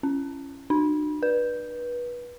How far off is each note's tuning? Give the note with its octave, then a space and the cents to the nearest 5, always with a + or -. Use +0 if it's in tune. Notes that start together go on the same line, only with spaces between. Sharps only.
C#4 -5
D4 +45
B4 -25